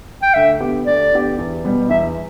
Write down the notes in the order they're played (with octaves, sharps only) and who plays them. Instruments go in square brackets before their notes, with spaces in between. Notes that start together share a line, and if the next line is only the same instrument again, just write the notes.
[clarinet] G5
[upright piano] D2 [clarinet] E5
[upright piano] D3 B3 G4
[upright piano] D2 [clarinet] D5
[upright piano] D3 B3 G4
E2
B2 G3 B3
[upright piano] E2 [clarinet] E5